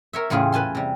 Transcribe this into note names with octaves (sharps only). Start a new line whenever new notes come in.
A#4 C#5 E5
E2 A2 C#3 F4 G4 G#4
B4 G#5 A5 C6
C3 G3